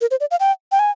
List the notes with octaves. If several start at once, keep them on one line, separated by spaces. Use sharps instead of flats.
A#4
C5
D5
F5
G5
G5
G#5